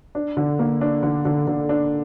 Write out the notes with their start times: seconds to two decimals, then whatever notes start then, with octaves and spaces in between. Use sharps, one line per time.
0.15 D4
0.37 D3
0.59 A#3
0.81 D4
1.03 D3
1.25 D3
1.47 D3
1.69 D4